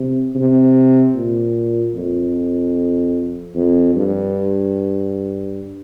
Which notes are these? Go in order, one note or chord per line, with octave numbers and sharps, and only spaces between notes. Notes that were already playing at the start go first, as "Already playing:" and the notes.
Already playing: C3
C3
A#2
F2
F2
G2